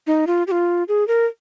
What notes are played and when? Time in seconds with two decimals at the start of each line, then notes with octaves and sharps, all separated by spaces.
0.07 D#4
0.27 F4
0.47 G4
0.51 F4
0.88 G#4
1.08 A#4